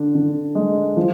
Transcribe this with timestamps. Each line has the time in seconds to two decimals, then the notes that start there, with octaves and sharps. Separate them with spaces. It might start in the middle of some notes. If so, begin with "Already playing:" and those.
Already playing: D3 D4
0.15 D3
0.55 G#3
0.97 F3